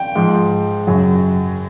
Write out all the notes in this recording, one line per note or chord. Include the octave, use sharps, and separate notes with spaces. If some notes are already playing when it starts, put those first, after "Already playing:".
Already playing: G5
G#2 F3
F#2 C#3 F#3